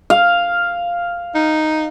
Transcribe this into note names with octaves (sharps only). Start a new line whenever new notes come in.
F5
D#4